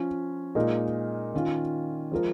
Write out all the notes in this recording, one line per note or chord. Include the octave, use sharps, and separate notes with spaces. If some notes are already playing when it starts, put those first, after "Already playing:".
Already playing: F3 C#4 F4
A#2 G#3 D#4 A#4
D#3 C#4 F4
F3 G#3 F4 A#4